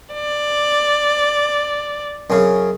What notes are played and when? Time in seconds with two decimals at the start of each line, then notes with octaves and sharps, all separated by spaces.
0.14 D5
2.30 F#2 C#3